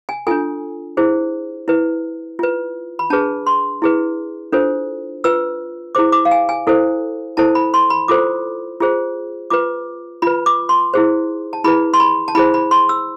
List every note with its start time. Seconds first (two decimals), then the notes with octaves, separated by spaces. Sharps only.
0.09 G#5
0.27 D4 F4 A4 G#5
0.97 E4 G#4 C5
1.68 E4 B4
2.39 F4 B4
2.99 B5
3.10 D4 G#4 B4 A5
3.47 C6
3.82 E4 G#4 B4
4.52 D4 F4 A4 C5
5.24 F4 B4 E6
5.95 E4 G#4 C5 D6
6.12 D6
6.25 F5
6.31 G#5
6.49 G#5
6.67 E4 A4 C5
7.37 E4 A4 C5 A5
7.55 B5
7.74 C6
7.90 B5
8.08 F4 A4 C5 D6
8.80 F4 G#4 C5
9.50 F4 B4 D6
10.22 F4 B4 B5
10.46 D6
10.69 C6
10.94 E4 G#4 C5
11.53 A5
11.64 E4 G#4 B4 B5
11.94 C6
12.00 B5
12.28 A5
12.35 E4 G#4 C5 B5
12.54 B5
12.71 C6
12.89 E6